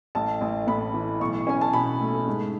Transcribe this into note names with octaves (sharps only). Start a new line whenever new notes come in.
A1 A5
A1
A2 B5
E3
B1 C#6
C#4 G#5
A5
B2 B5
A3
G#2